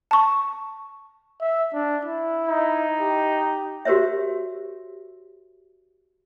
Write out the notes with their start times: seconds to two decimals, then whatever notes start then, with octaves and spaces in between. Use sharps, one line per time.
0.11 A5 C#6
1.41 E5
1.74 D4
2.05 E4
2.49 D#4
3.00 G4
3.85 F#4 G4 A#4 C5 C#5 E5